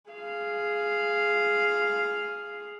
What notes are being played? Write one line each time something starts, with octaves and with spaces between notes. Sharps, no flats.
G#4 F5